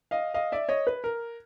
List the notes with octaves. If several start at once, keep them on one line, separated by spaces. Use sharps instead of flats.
D#5 F5
D#5 F5
D5 E5
C#5 D#5
B4
A#4